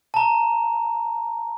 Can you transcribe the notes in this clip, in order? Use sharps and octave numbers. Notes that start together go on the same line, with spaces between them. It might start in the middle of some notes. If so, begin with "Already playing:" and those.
A5 A#5